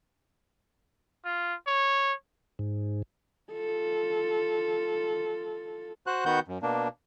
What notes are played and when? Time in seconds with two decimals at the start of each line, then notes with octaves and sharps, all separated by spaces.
1.25 F4
1.67 C#5
2.59 G#2
3.53 F4 A4
6.07 F#4 C5 F#6
6.26 D#3 B3 F#4 F#5 G6
6.48 F#2
6.62 B2 A#3 D4